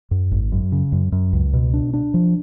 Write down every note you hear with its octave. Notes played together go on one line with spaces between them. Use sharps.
F#2
G#1
F#2
C#3
F#2
F#2
C#2
B2
D4
D4
F3